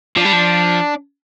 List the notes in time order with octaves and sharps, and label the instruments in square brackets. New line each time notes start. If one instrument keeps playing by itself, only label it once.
[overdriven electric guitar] F3 [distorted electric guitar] D4
[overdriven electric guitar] G3
F3